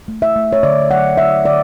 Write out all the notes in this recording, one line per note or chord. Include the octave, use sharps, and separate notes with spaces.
A3
E5
A3
C#5
D3 D5
F#3 F#5
D3 E5
D3 D5